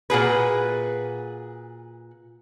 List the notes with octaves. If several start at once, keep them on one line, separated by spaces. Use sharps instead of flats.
A#2 F#4 G#4 B4